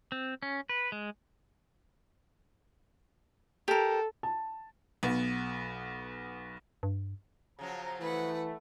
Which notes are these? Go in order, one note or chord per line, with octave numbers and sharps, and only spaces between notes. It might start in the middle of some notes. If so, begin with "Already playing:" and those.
C4
C#4
B4
G#3
G4 A4 A#4
A5
B1 B3
G2
C#3 F3 F#3 A#5
E3 A3 B4 F#5